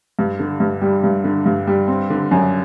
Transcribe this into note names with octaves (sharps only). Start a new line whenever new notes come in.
G2
D3
G2
G3
G2
D3
G2
G3
C4
D3
F#2